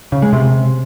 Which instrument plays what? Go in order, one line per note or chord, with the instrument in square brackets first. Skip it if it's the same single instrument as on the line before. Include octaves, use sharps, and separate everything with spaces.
[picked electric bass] C#3
G#3
C3